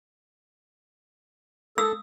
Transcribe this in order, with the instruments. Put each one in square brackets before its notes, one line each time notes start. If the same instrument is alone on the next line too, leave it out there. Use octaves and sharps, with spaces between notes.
[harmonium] A4 [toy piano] D#6 E6